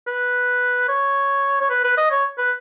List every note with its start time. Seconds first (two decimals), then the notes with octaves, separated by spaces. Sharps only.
0.07 B4
0.89 C#5
1.61 C#5
1.70 B4
1.84 B4
1.97 D#5
2.11 C#5
2.38 B4